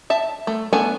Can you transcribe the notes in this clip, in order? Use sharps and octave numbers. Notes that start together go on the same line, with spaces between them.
E5 A5
A3
A3 B3 D4 A4 G#5